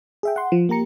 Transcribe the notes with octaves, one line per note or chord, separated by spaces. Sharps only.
G#4 E5 G5
F#5 C6
F3
A#3 G4 A#5 C#7